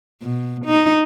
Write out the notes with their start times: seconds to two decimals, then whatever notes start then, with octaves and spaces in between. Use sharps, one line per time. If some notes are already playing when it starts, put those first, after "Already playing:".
0.22 B2
0.65 D#4